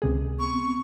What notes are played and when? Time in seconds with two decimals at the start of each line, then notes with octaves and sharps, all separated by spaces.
0.02 C#2 C3 G#4
0.40 B3 C4 C#6